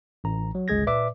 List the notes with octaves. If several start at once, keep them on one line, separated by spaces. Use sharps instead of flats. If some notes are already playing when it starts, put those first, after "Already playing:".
A1 A#5
F#3
G1 C#2 G#3 G#4 G#6 A#6
A#2 B4 D5 E5 D6